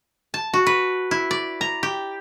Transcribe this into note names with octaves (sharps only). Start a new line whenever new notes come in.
A5
F#4
B4
E4
D5
A#5
G4